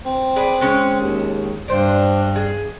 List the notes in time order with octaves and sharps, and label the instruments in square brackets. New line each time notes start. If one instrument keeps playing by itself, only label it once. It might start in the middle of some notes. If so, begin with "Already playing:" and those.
[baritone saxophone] C4
[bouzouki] G#4 B4 D5
G#3 C#4
[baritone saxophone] D#2
[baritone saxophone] G2 [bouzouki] D4 C5
[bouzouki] G#4